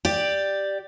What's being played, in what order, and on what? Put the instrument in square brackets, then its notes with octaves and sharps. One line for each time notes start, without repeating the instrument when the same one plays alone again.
[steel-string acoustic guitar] G4 D5